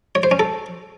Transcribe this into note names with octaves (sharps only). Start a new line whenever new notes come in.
C#5
C5
C#4
A4